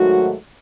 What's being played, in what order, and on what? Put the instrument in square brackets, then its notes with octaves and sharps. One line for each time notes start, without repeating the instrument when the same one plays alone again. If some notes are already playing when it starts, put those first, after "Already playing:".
Already playing: [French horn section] G#2 D#3 F#3 A3 F#4